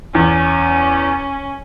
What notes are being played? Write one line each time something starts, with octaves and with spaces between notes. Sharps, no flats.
E2 C#4